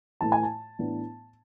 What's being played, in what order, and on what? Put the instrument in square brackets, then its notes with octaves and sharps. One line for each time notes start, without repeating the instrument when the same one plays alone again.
[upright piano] A2 E3 A3 A5
G#5
A5
A2 E3 B3 D4